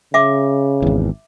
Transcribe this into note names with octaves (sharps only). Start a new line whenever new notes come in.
C#3 E5 D6
G#1 E2